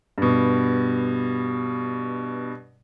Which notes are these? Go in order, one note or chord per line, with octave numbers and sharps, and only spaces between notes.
G2 B2